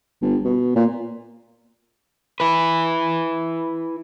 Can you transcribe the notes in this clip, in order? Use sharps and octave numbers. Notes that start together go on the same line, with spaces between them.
G1
B2
A#2
E4 B4